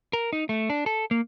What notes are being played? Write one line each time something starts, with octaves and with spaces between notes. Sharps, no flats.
A#4
D#4
A3
D4
A4
A#3